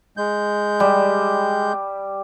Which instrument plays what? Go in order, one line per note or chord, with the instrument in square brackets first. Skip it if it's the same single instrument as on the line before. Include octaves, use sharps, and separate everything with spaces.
[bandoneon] G#3 G6
[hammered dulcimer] G3